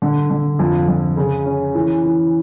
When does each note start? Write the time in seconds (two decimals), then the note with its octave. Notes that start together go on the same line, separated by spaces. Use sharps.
0.02 D3
0.30 D3
0.59 F2
0.88 F2
1.17 C#3
1.45 C#4
1.75 E3
2.04 E3